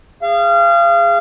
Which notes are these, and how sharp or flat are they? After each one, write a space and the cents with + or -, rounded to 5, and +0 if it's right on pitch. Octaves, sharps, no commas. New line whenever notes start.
G#4 -20 F5 -30